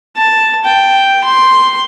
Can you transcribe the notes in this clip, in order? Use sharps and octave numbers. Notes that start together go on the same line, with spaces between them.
A5
G5
C6